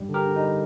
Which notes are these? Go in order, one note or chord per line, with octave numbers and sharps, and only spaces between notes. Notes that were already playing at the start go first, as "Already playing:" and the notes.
Already playing: G2 G3
D3
G4 A#4
D3
D#4
G3